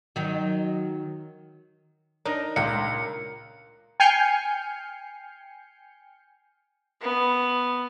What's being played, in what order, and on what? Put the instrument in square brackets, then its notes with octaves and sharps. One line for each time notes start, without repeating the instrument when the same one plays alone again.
[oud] D#3 F#3
[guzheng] D4 D#4 [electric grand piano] A#4 A#6
[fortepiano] C#2 [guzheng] A#2 G5 [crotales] C#7
[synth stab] G5 G#5 F6 G6 C7 C#7
[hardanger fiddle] B3